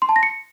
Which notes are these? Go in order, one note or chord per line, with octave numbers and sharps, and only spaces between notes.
C6
A5
A#6
C#7